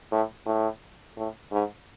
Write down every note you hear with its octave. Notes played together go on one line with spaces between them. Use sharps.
A2
A2
A2
G#2